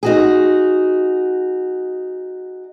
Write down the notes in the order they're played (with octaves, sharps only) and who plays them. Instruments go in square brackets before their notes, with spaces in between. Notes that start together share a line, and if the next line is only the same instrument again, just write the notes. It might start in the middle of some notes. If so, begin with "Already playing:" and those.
[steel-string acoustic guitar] D#4 F#4 G#4